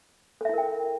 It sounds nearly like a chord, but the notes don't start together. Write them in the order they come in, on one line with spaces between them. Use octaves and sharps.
A4 E5 E4 A#4 G5